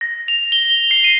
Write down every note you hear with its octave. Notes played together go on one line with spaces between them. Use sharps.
A#6
F7
G7
C7
D#7